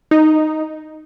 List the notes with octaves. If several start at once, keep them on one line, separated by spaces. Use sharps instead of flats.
D#4